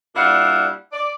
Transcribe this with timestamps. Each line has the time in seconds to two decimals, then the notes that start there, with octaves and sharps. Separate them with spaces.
0.15 A#2 G3 D4 E4 F5 F#5
0.92 D5